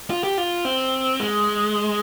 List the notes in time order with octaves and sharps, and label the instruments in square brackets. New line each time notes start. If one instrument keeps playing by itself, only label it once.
[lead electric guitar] F4
G4
F4
C4
G#3